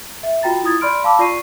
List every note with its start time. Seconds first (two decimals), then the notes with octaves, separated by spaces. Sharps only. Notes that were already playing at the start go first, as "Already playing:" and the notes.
0.23 E5
0.43 F4 F#4 G5 A#5 A6
0.63 E4 F4 D#6 G#6 A6
0.81 D5 B5 C6 F6 D7
1.04 F5 A5 B5 D6 E6
1.19 F4 D5 C#6 C7 D#7